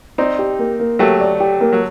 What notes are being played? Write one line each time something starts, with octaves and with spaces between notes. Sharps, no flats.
C4 D#4 D5
G4
A#3
A#3
F#3 A3 G4
D5
G4
A#3
F#3